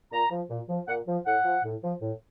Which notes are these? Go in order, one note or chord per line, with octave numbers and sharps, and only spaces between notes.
A#2 A#5
F3
A#2
F3
A#2 F#5
F3
A2 F#5
F3
A2
F3
A2